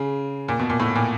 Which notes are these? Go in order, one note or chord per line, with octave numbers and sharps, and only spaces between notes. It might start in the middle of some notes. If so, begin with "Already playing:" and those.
Already playing: C#3
A#2
B2
A#2
A2
A#2